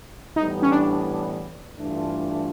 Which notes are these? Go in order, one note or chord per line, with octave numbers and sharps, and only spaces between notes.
A2 E3 G3 B3 D#4
C#4
D4
G2 E3 A3 D4 F4